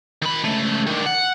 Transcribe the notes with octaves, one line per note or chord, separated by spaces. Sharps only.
D#3 B5
C#2 A3
D3 D#3
F#5